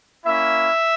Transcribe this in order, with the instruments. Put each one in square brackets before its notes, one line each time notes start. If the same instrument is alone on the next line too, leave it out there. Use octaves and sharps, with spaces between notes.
[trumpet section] A#3 C#4 E4 E5